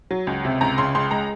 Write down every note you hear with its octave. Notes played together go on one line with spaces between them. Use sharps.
F#3
C#2
C3
C#2 A#5
C#3 C6
C#2 C6
G#3 A#5